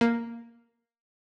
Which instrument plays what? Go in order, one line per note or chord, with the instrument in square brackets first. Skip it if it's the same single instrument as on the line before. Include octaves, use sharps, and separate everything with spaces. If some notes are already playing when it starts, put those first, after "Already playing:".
[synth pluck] A#3